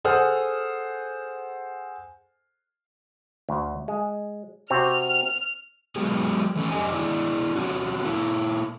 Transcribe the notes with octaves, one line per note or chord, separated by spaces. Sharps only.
G#4 A4 C5 F#5 D#6 F6
D2
G#3
C3 C4 F#4 F6
F#3 G#3 B3 G4 G#4
E3 A3 C#4
F2 G#2 G4 D#5 G#5
D4 E4 G#4
C4 C#4 F#4
A#2 A#3 E4